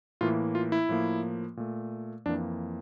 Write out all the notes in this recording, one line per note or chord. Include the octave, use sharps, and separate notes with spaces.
A2 E3 A#3 F4
F4
E4
A2 F3 A#3
A#2 A3
F2 E3 A#3 D4